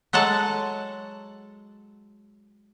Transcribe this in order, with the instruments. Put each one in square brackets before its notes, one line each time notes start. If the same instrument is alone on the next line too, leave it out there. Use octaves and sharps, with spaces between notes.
[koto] F#3 G#3 A4 F#5 A5